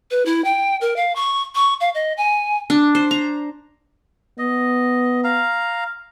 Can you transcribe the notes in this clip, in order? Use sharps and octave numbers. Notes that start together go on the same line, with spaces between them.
B4
E4
G5
A#4
F5
C#6
C#6
F5
D#5
G#5
D4
C5
A#5
B3 D#5
F5 A#5